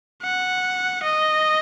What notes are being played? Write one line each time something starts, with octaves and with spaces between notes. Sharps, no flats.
F#5
D#5